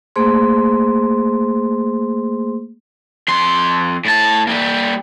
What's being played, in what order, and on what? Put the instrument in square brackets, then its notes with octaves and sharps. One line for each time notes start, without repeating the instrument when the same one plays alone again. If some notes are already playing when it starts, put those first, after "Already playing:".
[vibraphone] A3 A#3 G#4 C5 C6
[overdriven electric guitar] F2 C6
A2 A5
G3 A#3